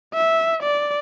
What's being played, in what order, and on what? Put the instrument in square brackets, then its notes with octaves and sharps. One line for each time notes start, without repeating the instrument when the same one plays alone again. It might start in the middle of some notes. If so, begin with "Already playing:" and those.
[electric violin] E5
D5